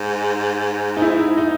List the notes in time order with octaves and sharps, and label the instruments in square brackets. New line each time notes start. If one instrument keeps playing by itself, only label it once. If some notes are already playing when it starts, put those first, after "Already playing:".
Already playing: [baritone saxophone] G#2
[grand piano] D#4
E4
D#4